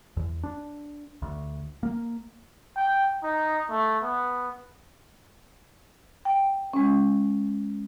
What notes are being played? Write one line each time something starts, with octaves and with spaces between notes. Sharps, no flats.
E2
D4
D2
A#3
G5
D#4
A3
B3
G5
G#3 C#4